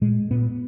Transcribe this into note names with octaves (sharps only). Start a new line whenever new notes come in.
A#2 G#3
A#2 B3